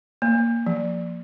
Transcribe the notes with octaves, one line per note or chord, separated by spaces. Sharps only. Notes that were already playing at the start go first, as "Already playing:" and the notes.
A#3
F3